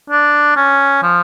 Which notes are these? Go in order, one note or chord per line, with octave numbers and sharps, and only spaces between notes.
D4
C#4
F3